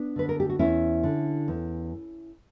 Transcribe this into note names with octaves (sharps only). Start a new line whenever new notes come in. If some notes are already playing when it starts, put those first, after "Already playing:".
Already playing: B3 D4
D3 B4
A#4
G4
F#4
E2 C#4 E4
D3
E2